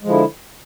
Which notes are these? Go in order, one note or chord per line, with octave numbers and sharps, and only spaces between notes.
D3 F3 G#3 E4